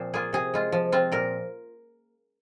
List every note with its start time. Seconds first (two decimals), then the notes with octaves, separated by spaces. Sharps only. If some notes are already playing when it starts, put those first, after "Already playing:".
Already playing: A#2 F3 C4 C5
0.14 A#3 F4 G#4
0.33 C3 G#4
0.54 G#3 F4
0.72 F3
0.92 C4 F4
1.12 A#2 A#4